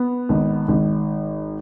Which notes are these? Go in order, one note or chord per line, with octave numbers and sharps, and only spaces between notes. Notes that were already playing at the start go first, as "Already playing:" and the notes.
Already playing: B3
G#1
G#1